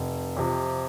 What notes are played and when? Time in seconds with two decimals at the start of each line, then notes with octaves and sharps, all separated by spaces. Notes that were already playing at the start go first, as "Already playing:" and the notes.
Already playing: F1
0.37 F2 C3 F3